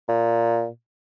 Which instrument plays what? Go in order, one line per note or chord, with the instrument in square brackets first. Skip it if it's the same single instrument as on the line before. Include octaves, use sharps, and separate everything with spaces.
[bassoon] A#2